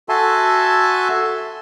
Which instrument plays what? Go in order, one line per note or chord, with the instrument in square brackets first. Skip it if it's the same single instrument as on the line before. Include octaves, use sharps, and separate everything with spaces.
[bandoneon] F#4 A4 E5 G#5 A5 C6